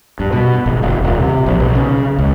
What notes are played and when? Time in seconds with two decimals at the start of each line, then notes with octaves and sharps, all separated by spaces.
0.20 G2
0.32 B2
0.66 G#1
0.83 F1
1.04 D#1
1.20 C3
1.46 A#1
1.60 B1
1.75 C#3
2.19 C#2